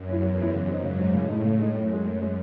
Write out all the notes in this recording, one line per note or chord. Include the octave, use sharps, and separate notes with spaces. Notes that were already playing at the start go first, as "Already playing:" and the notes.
Already playing: F#2
C#4 E4
E2 F#3
C#4 E4
F#2 C#3
F#3 C4 D#4
G#2 C#3
F#3 C4 D#4
A2 C#3
G#3 D#4
C#3
G#3 D#4
F#2 A2
G#3 C#4
A2
G#3 C#4